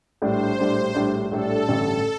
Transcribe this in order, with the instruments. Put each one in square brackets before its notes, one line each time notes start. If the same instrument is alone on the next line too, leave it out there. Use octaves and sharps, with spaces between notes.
[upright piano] A#1 A2 G3 D4 [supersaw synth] C5
[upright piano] A#1 A2 G3 D4
A#1 A2 G3 D4
[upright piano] A#1 A2 G3 D4 [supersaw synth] A4
[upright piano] A1 G2 D3 A3